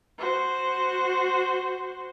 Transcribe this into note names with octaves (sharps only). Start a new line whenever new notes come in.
F#4 C5